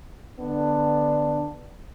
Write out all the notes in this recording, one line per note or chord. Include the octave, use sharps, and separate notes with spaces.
D3 B3 D4